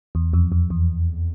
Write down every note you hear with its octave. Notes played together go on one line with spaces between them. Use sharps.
E2
F2
F2
E2